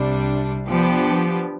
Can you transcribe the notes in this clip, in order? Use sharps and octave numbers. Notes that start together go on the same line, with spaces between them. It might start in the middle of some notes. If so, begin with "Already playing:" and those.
Already playing: C2 C3 G3 D4
F3 B3 D4 G4